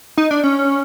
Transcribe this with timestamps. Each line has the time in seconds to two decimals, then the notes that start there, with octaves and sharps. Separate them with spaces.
0.17 D#4
0.31 D4
0.44 C#4